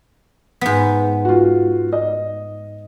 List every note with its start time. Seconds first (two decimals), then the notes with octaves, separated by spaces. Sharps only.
0.61 G#2 B3
1.25 F4 F#4
1.93 D#5